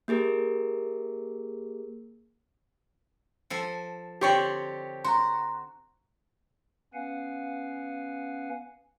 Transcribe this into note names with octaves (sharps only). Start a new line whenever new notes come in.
A#3 G4 G#4 A#4
F3 A4 G#5
D3 C4 G4 C#5 D5
F#4 A#5 C6
B3 C#4 B4 F5 F#5 G#5